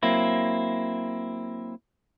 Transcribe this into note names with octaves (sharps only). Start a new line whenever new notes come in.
F#3 A#3 C4 E4